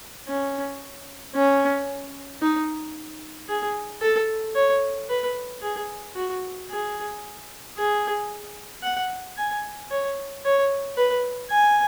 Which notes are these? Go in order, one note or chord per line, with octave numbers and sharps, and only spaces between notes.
C#4
C#4
D#4
G#4
A4
C#5
B4
G#4
F#4
G#4
G#4
F#5
G#5
C#5
C#5
B4
G#5